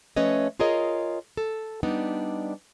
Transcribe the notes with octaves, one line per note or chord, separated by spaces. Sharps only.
F3 A3 C#4 B4 C#5 D#5
F4 G#4 A#4 C#5 D#5
A4
G3 B3 D4 D#4